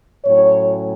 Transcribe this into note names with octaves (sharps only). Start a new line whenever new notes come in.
A2 F#3 C#4 C#5